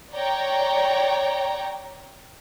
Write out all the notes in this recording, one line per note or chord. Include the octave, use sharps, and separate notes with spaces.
C#5 D5 G5 A#5